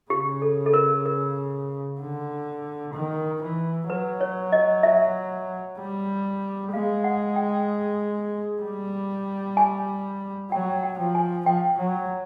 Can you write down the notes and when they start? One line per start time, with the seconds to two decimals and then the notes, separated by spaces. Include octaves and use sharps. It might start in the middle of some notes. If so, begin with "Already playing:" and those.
0.10 C#3 G4
0.42 A4
0.66 A4
0.74 A#4
1.06 A#4
2.00 D3
2.94 D#3
3.42 E3
3.89 F#3 B4
4.21 C#5
4.52 D#5
4.83 E5
5.79 G3
6.73 G#3 F5
7.04 F#5
7.36 G5
8.62 G3
9.57 G#5
10.51 F#3 G5
10.83 G5
10.99 F3
11.15 G#5
11.46 F3 G5
11.78 F#3